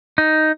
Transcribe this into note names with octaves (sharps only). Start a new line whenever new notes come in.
D#4